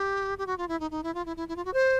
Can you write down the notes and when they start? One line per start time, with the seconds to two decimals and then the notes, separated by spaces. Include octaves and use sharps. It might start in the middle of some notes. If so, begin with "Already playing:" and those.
Already playing: G4
0.38 G4
0.47 F#4
0.58 F4
0.68 E4
0.80 D#4
0.91 D#4
1.03 E4
1.14 F4
1.25 E4
1.37 E4
1.48 E4
1.56 F4
1.65 F#4
1.74 C5